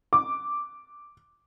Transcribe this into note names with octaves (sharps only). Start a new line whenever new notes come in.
D6